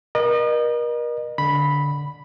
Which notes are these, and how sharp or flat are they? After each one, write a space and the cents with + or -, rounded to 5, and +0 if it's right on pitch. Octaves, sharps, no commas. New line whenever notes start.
A#4 +35 D#5 -40
D3 -10 B5 +0